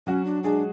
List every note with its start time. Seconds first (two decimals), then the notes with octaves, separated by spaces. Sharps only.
0.07 F#3 C#4 F#4
0.25 D4
0.43 G#3 D4 G#4